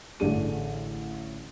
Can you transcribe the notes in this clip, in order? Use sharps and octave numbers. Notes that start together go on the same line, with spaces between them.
A1 D3 A3 D4 G#4 D#7